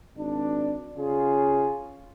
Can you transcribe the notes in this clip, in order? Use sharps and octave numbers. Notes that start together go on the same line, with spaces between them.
G#1 D4
C#3 F4 G#4